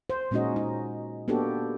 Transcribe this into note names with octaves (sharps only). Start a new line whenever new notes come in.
C5
A#2 G#3 C#4 D#4 F#4 D#5
D#4
A#3 B3 D4 F#4 G4 A4